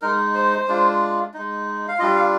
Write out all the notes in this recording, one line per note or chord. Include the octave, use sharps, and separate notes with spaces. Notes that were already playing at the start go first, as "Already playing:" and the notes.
G#3 D#4 A#4
C5
G#3 D4 F4
G#3 D#4
F5
G3 D4 F4 D#5
F5